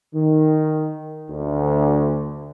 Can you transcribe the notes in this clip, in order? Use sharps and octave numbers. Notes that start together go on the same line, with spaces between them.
D#3
D2